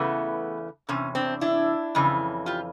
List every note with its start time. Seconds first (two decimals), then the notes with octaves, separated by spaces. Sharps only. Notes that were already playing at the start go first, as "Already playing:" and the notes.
Already playing: E2 C#3 E3 A3 B3
0.89 E2 C3 C#4
1.15 C4 D4
1.41 D4 E4
1.95 F2 C#3 E3
2.46 F4 G4